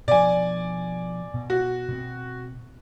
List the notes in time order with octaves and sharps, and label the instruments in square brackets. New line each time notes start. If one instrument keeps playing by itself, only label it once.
[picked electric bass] B2 F3 [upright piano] D5 G#5
[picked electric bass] B2
[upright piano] F#4
[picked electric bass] B2 G#3 C4